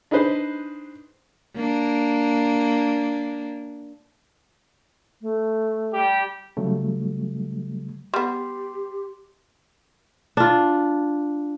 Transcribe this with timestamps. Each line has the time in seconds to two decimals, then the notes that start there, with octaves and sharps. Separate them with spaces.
0.11 D4 D#4 G#4 B4 C5
1.56 A#3 D4
5.22 A3
5.93 G3 G4
6.57 C#3 F#3 G3 A3
8.14 G3 B3 G4 C6
10.37 D4 F4